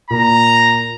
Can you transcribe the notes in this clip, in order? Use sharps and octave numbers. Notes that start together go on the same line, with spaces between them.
A#2 A#5